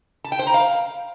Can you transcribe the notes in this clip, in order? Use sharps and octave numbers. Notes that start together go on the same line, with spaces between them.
A5
G5
C5
A#5
F5